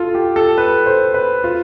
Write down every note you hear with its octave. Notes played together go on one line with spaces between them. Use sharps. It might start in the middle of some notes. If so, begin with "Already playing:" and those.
Already playing: F4 A4
G4
A4
B4
C5
B4
F4